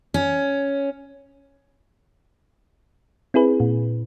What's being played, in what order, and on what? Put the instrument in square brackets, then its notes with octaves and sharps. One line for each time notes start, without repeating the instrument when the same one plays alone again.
[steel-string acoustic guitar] C#4
[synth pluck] C4 E4 G#4 B4
A#2